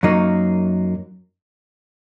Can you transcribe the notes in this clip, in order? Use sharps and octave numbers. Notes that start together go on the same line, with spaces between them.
F#2 F#3 A#3 D#4